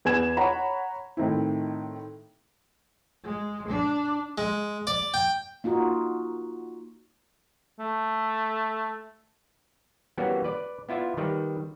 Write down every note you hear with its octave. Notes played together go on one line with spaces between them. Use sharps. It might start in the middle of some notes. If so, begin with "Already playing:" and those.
E2 B3 G#5 G#6 E7
C#5 F#5 A#5 B5
A2 D#3 C4 E4
G#3
D4
G#3
D5
G5
A#3 D#4 F4 F#4
A3
E3 G3 A#3 B3 C#4 F#4
B4 D5
B3 E4 F4 D5 E5
D#3 G3 B4